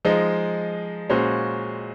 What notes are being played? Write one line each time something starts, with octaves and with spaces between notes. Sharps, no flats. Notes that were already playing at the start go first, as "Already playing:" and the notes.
F3 G#3 D#4
A#2 G#3 C#4 F#4 C5